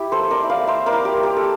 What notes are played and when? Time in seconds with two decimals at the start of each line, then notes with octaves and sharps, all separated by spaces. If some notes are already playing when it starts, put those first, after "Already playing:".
Already playing: E4 G4
0.12 A4 C5
0.18 A#3
0.31 A#4 D5
0.43 E4
0.50 D5 F5
0.67 A#3 C5 E5
0.86 A#4 D5
0.92 E4
1.05 G4
1.17 A#3
1.23 G4
1.37 A4